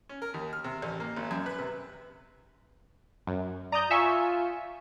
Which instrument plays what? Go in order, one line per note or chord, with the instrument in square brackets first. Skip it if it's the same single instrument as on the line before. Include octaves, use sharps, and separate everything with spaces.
[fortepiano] C#4
A#4
D#2
F6
C3
A1
A#3
G#1
F#2
B4
C3
[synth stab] F#2
[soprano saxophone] D5 [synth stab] A#5 D#6 G6
[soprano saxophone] F4 [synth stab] E5 G#5 C#6